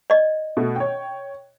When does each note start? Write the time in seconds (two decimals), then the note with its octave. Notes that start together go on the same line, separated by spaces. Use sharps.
0.10 D5 D#5
0.57 B2 A3
0.76 C#5 G5